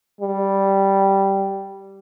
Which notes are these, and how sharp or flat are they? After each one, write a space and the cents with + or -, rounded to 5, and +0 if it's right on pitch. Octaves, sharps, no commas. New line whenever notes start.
G3 -5